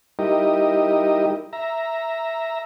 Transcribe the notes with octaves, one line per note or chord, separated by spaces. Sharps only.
G3 D#4 E4 G4 A#4 D#5
E5 A#5